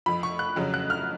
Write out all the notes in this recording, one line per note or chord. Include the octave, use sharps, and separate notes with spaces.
F2 F3 B5
C#6
F#6
F2 C#3 F#3
F#6
F6